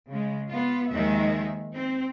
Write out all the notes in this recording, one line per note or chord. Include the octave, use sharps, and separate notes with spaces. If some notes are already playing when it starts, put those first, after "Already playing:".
C#3 G#3
B3 F4
D#2 D#3 F3 G#3 E5
C4